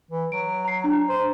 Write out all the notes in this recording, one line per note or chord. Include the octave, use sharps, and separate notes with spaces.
E3
F#3 D7
A#5 C7
D4 A#5
C5